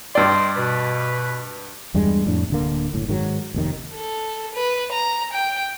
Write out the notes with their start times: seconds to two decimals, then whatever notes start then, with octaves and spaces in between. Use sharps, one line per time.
0.15 G2 D5 D#5 G5 C6
0.56 B2 B4
1.94 E2 G2 G3 G#3
2.26 F2 A2 D4
2.50 D1 D3 A#3
2.93 F#1 A2
3.09 G#2 D#3 F#3
3.54 F1 D#2 D#3
3.94 A4
4.54 B4
4.92 A#5
5.33 G5